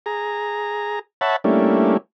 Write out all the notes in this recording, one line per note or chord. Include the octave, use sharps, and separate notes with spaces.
G#4 A#5
C#5 E5 F#5 A5 B5
G3 A3 A#3 C#4 D4 E4